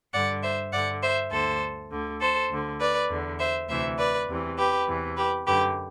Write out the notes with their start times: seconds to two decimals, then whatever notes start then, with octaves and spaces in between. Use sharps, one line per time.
0.13 G2 D3 D5 F#5
0.43 C5 E5
0.73 G2 D3 D5 F#5
1.03 C5 E5
1.32 D2 D3 A4 C5
1.91 D2 D3
2.21 A4 C5
2.51 D2 D3
2.80 B4 D5
3.10 E2 D3
3.40 C5 E5
3.69 D2 C3 E3 C5 E5
3.99 B4 D5
4.28 E2 C3 E3
4.58 G4 B4
4.88 E2 C3 E3
5.17 G4 B4
5.47 F#2 D3 G4 B4